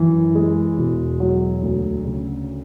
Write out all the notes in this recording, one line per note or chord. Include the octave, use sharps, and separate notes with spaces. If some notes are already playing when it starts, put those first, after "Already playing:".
Already playing: F#2 E3
G#3
E1
F#3
D2
C#3